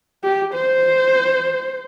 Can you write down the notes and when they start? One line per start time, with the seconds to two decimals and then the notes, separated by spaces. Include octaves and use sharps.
0.24 G4
0.54 C5